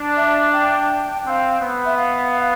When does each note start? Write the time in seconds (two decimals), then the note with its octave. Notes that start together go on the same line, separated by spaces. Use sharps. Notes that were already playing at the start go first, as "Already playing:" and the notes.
Already playing: D4
0.17 E5
0.53 G5
1.25 C4 F5 G5
1.61 B3
1.85 E5
1.97 F5